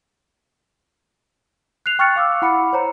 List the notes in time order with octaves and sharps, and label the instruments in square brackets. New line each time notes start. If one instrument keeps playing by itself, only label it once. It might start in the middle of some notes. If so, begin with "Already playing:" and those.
[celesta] F#6 C7 F7
G5 C#6 F6 F#6 A6 C#7
F5 D6 E6
E4 F#5 B5 D6 C#7
C5 C#5 A#5